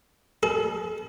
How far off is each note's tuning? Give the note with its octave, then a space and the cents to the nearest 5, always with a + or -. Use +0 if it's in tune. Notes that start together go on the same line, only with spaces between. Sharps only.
A4 -40